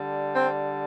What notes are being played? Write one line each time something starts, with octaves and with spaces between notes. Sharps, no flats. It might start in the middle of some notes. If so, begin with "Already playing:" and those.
Already playing: D3 G3
C4